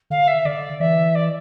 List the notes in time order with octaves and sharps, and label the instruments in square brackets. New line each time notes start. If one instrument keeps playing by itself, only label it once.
[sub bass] D3 [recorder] F5
[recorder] E5
[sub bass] D3 [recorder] D5
[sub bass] E3 [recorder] E5
[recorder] D5